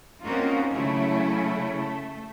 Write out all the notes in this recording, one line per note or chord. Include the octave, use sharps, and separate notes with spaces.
A#3 C4 C#4 D#4 F4 F#4
C#3 F#3 A3 E4 C#5
A3